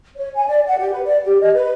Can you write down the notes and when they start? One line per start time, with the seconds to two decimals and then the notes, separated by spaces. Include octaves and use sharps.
0.16 C#5
0.35 G#5
0.48 D5
0.66 F#5
0.79 G4
0.92 B4
1.04 D5
1.24 G4
1.41 D#5
1.54 B4